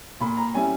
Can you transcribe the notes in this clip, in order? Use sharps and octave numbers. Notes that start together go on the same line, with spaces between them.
A#2 B5
A#5
G3 C#4 E4 G#5